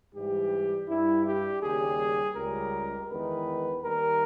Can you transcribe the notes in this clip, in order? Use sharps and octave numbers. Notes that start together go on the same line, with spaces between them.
G#2 E3 G3 G4
G2 G3 E4
G4
D#2 C#3 G3 G#4
C#2 C#3 G3 A#4
E2 D#3 G#3 B4
D#2 D#3 G3 A#4